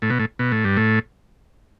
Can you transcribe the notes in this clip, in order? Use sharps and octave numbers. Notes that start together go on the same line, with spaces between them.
A2
B2
A2
B2
A2
G2
A2